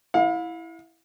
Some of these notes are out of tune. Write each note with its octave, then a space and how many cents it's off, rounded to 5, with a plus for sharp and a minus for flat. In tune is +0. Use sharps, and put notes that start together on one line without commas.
E4 +0 F5 +40